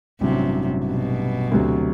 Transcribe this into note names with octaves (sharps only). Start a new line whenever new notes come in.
A1 G2 C3 F#3
B2
D2 C3 F#3